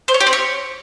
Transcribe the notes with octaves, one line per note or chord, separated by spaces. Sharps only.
C5
C#5
G4
C4
C#5